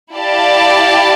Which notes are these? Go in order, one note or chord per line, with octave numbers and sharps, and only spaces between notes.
E4 G4 D5 F5 A5